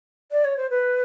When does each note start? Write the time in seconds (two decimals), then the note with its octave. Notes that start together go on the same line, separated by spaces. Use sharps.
0.32 D5
0.45 C#5
0.57 C5
0.70 B4